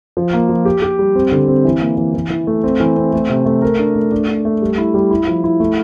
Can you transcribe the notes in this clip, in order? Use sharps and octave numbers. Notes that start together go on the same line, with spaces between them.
F3
A#3
F3
G4
G4
G3
C4
D3
C4
E3
A#3
E3
E3
E3
A3
C4
E3
C4
A3
C3
A3
A#4
D4
A3
D4
D4
A3
G3
E4
G3
E4
F3
E4
A3